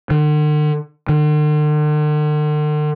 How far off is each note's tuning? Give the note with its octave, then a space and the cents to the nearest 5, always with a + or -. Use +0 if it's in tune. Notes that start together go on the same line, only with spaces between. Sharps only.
D3 +45
D3 +45